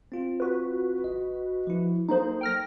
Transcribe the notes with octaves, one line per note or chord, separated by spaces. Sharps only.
C4 F4
F#4 B4
G#1 D#5
F3 E4
F#3 A#3 D#4 A4 C5
G5 F6 A#6